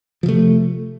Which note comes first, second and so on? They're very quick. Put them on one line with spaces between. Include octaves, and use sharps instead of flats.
F3 C3 A3